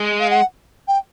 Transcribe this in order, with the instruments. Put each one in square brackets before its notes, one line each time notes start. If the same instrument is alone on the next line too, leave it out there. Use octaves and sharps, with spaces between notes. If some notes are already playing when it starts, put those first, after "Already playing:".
Already playing: [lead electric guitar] G#3
[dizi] F5
F#5
G5